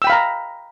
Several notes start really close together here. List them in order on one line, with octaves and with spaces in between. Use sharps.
E6 G5 B5 F5 A#5